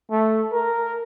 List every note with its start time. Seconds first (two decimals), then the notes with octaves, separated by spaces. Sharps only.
0.11 A3
0.52 A#4